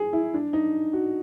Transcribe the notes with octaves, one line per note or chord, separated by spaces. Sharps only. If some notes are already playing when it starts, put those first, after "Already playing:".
Already playing: G#4
E4
D4
D#4
F#4